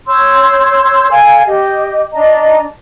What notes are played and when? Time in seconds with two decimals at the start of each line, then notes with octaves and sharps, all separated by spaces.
0.07 C#5 C6 E6 G6
1.11 A4 F5 G#5 G#6
1.47 G4 D#5
2.13 D4 D#5 A#5